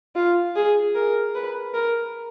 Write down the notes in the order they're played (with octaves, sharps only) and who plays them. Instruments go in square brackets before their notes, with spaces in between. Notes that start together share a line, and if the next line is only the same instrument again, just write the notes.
[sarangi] F4
G#4
A#4
B4
A#4